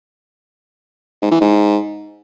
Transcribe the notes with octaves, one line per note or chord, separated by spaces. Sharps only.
G#2
E3
G#2